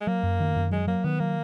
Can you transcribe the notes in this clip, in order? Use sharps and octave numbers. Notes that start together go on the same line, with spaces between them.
G#3
F#3 A#3
F#2
D#3
F#2
F#3 G#3
F#3 A#3
D#3 B3
F#3 A#3